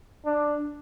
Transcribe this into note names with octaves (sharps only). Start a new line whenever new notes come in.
D4